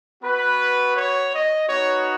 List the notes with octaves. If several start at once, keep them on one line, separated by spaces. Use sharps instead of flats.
B3 F#4 B4
C#5
D#5
B3 D#4 F#4 C#5